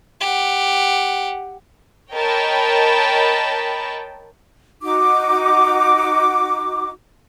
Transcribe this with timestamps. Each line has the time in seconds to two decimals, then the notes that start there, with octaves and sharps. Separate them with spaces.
0.21 G4 F#5
2.13 A#4 C#5 D#5 G5 A5 B5
4.82 D#4 F#4 D6